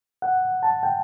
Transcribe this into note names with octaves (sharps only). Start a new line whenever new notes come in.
F#5
A5
G5